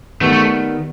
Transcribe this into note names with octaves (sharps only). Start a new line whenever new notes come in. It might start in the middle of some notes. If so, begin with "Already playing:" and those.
D#3 G3 A3 B3
A3